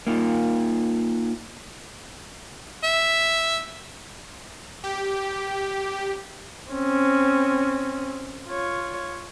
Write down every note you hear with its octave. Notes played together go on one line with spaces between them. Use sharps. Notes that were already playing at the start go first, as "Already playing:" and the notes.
A#3 D#4 F4
E5
G4
C4 C#4
F4 C#5